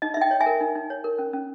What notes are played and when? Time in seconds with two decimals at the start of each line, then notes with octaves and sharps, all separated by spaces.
0.02 D#4 D#5
0.14 E5
0.17 D#4 D#5 G5
0.31 C#5
0.41 E5 G#5
0.46 A#4
0.61 D#4
0.75 D#4
0.90 C#5
1.04 A#4
1.19 C#4
1.33 C#4